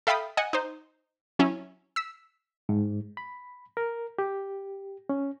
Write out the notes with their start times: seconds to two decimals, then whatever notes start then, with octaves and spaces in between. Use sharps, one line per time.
0.07 A4 E5 F5 G5 B5 D#6
0.37 D#5 F#5 G#5
0.53 D#4 C5
1.39 F#3 C#4 E4
1.96 E6 B6
2.69 G#2
3.17 B5
3.77 A#4
4.19 G4
5.09 C#4